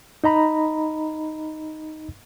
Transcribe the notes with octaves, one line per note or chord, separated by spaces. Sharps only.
D#4 D#5 A#5 B5